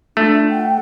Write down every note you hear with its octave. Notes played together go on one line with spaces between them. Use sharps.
A3 D4 F4
F#5 G5